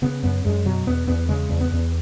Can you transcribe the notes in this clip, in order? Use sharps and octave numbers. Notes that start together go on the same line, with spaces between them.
C#3 B3
F#2 B3
F#2 G#3
B2 F#3
E2 B3
E2 B3
C#3 G#3
E2
B3
E2